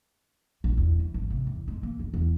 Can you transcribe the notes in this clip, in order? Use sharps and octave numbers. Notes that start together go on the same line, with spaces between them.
A#1
E2
E3
G#1
C3
E2
G#2
A#3
F2
E2